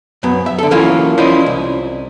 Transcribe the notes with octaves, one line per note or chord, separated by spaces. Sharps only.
F#2 F#3 B3
E5
D3 A4
E3 F#3 A#3 C#4 E4 F4
C#4 E4 F4 C5 D5 D#5
C2